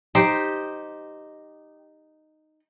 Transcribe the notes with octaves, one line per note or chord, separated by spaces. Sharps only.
D#4 G4 C5 G5